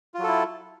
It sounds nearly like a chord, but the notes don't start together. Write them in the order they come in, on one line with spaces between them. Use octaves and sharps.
F4 F#3 A4 E4